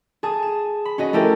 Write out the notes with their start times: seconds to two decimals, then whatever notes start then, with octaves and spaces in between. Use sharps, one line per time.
0.23 G#4 A5 D#6
0.43 E7
0.85 B5
0.98 C#4 F#4 D#5
1.13 A3 E4 G4 A4 A#4